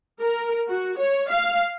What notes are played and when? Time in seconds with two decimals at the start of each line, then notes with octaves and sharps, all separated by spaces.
0.21 A#4
0.68 F#4
0.98 C#5
1.29 F5